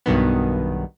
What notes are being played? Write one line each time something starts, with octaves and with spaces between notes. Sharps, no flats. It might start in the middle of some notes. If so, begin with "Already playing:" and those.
B1 G2 B2 D#3 B3